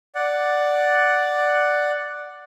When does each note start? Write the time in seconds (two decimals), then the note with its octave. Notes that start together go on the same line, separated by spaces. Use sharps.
0.15 D5 F#5